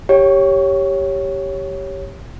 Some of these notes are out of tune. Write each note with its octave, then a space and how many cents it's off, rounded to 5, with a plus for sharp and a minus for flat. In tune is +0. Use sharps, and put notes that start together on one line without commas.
G4 +0 C#5 +0